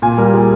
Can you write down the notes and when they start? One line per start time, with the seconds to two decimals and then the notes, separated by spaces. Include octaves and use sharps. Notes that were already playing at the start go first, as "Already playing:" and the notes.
0.02 A#2 G#5
0.18 G3 A#4
0.34 A#2 G#4